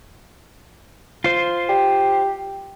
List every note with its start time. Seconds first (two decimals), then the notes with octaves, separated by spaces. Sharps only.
1.24 F4 C5
1.69 G4